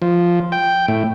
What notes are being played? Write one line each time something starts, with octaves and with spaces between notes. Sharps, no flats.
F3
G5
A2